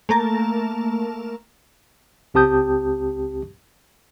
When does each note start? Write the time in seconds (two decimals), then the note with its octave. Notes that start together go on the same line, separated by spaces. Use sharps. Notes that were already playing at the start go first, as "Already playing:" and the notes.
0.09 A3 A#3 A#4 A5
2.34 C#2 C4 G4 A5 D#6 G6